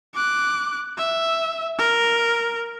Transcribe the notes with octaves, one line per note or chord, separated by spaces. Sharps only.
D6 F#6
E5
A#4